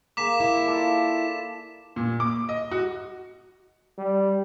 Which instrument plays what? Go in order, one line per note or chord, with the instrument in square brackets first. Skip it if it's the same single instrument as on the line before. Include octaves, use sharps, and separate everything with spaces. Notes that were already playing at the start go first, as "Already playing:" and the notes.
[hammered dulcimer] A#3 G#4 [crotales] D6 B6 E7
[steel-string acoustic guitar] E4
[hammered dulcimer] F4 A4 D5
[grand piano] A#2
D6
D#5
F#4
[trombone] G3